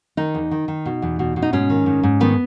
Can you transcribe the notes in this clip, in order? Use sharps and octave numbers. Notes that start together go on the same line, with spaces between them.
D#3 D#4
E2
D#3
D#3
B2
E2
B2
B2
D#4
G#2 C#4
D#3
G#2
G#2
D#3 B3